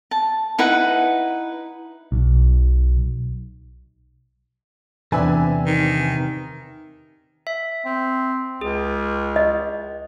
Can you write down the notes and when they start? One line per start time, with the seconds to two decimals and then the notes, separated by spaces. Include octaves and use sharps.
0.11 A5
0.58 D#4 E4 B4 F#5
2.12 B1
5.12 E2 C3 C4 D4 B4 E5 G5 G#5
5.66 D#3
7.47 E5
7.85 C4
8.61 C#2 G#4
9.36 D#5